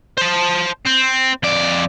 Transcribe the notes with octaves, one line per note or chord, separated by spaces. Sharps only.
C5 A5
C4
F2 D5